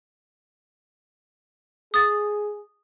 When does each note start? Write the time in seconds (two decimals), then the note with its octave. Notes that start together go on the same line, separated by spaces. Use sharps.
1.94 G#4 D#6 A6